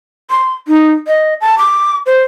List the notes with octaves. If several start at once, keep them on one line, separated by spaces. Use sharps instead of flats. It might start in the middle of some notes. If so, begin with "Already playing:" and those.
C6
D#4
D#5
A5
D6
C5